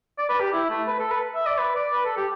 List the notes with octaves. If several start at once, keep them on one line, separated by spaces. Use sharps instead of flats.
D5
B4
G4
E4
A3
B4
A4
B4
E5
D5
B4
D5
B4
A4
G4